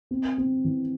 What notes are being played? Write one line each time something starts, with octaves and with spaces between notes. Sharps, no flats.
C4
C4
E3